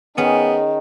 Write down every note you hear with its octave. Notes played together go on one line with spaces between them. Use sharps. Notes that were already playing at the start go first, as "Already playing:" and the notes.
D#3 B3 C#4 G#4